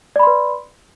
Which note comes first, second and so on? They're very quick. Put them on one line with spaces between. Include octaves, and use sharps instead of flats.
D5 B5 C6 B4